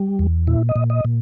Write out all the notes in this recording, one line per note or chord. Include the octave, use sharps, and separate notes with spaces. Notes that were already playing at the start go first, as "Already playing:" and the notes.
Already playing: G3
E2
A#2 E4
D#5
A#2
D#5
A#2